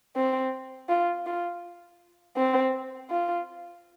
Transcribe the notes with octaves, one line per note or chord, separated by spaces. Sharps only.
C4
F4
F4
C4
F4